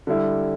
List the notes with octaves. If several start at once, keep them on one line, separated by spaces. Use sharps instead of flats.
D3 G3 E4